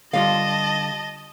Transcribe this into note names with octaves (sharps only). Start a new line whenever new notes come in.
D3 G3 F4 D#5 F5 A5